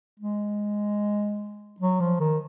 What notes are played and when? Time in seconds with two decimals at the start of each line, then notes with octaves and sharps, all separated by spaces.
0.20 G#3
1.80 F#3
2.00 F3
2.20 D#3